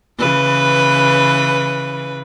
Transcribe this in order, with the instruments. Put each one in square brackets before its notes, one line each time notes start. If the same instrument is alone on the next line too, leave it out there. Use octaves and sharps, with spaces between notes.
[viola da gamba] C#3 E3 B4